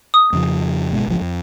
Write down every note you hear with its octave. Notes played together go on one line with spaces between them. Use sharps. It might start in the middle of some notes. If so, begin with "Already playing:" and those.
D#6
F2 C#3 F3
G1 B2 G#3
G#1 C#2 F3
F2